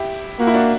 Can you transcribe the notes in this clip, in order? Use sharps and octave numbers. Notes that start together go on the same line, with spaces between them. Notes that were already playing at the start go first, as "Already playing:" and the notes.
Already playing: E4 G4
A#3 F#4
E4
D4 F#4